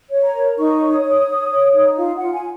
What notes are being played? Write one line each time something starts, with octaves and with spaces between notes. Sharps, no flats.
C#5
A#5
A#4
D#4 C#6
C#5
D#6
C#5
C#5
C#5
D#4
F4 F5
F#5
F4
G#5